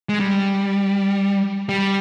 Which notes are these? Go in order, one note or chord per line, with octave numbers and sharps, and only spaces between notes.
G#3
G3
G3